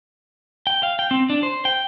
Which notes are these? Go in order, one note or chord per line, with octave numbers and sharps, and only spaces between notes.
G5
F5
G5
C4
D4
C5
G5